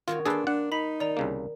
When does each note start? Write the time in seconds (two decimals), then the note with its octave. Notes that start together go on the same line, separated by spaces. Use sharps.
0.08 D#3 F4 F#4 C#5
0.26 A#3 D4 F4 G#4 A4 B4
0.47 D4 F#5
0.72 D#4 B5 B6 F7
1.00 D#3 D5 A#5
1.17 C2 C#3 A#3